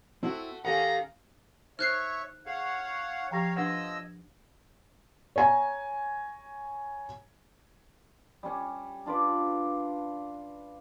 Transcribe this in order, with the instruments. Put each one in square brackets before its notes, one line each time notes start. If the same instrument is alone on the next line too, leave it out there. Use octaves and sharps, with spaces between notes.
[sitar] A3 F#4 [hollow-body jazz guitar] C4 E4
[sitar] D#3 G#3 C#4 [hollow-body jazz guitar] G4 A4 F#5 [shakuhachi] F5 [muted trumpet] A#5
[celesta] D#4 [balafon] C5 [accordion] C#5 E5 C#6 [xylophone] F6 F#6 C7
[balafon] G#4 [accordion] C#5 F5 F#5
[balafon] F3 G4 [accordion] C#5 F5 [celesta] G5 A#5 A#6
[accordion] F3 D#5 E6 [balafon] D4 B4 F#5 [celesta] G#6 A#6
[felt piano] C#5 G#5 A#5
[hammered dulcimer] G3 C#4
D4 F4 B4 D6